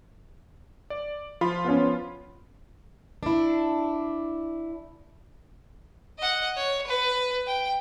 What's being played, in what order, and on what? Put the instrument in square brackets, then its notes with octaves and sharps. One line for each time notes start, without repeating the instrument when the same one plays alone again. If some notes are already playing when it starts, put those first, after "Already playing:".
[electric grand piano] D5
F3 F4 B5
[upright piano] B3 C#4
[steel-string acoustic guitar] D4 E4
[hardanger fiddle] D#5 F#5
C#5
B4
G5